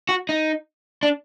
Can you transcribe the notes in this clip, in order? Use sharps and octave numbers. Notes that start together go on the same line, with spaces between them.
F#4
D#4
D4